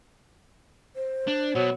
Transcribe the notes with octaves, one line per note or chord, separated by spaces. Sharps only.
C5
D4
B2 F#3